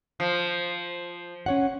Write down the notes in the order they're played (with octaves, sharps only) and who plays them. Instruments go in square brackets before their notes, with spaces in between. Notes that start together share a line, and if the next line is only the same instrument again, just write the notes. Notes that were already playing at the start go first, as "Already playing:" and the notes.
[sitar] F3
[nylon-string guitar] C#4 C#5 F#5